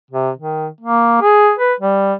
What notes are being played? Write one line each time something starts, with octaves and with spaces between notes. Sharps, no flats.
C3
D#3
A#3
G#4
B4
G3